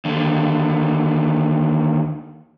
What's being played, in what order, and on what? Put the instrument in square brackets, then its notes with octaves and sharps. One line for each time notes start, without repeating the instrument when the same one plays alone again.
[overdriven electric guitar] D#2 D3